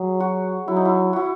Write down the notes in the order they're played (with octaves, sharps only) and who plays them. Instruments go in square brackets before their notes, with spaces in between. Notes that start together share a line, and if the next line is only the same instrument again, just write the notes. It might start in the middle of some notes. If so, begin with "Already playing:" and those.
Already playing: [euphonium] F#3 [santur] G#4
[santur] F#4
[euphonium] F#3 [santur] E4
[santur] D#4
E4
E4 F#4